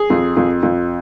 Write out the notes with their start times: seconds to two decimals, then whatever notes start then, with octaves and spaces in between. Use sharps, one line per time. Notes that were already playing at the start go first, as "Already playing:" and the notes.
Already playing: G#4
0.10 F2
0.37 F2
0.63 F2